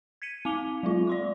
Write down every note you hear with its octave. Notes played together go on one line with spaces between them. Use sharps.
G#6 B6 C#7 D#7
C4 F5 D6 F7 G7
F#3 G#3 F4
D5 C6 D6